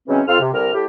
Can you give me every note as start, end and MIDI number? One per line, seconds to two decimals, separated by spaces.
0.08 0.22 49
0.08 0.22 52
0.08 0.22 54
0.08 0.22 56
0.08 0.22 60
0.08 0.22 61
0.27 0.39 41
0.27 0.39 65
0.27 0.39 69
0.27 0.39 89
0.40 0.52 48
0.53 0.72 36
0.53 0.72 50
0.53 0.72 70
0.53 0.72 89
0.74 0.86 45
0.74 0.86 67